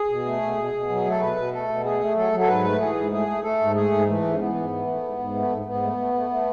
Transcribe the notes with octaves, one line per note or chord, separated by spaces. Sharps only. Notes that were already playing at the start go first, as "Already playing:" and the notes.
Already playing: G#4
B2
A3
B2
B2
B2
F#3
A3
A4
B2 B4
B2
A3 A4
B2
A3 G#4
A3
F#3 A4
F#3
A4
G#2 B4
A3
E3 G#4
G#2
A3 G#4
A3
A3 A4
G#2
A3 G#4
G#2
E3 A3
G#2
C#4
E3 B3
G#2
E3
A3
G#2
G#2
A3
G#2
G#2 B3
A3
A3
A3
A3